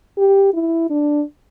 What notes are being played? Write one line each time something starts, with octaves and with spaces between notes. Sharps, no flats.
G4
E4
D4